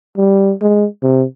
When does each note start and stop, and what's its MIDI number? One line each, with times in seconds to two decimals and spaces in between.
0.17 0.54 55
0.61 0.86 56
1.03 1.25 48